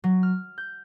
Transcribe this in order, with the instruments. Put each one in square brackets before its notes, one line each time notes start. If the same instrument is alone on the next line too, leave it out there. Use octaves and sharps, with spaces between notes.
[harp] F#3
F6
G6